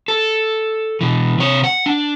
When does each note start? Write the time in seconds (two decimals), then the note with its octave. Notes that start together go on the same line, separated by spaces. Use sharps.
0.08 A4
1.01 B2 E3
1.38 C3 C#5
1.64 F#5
1.86 D4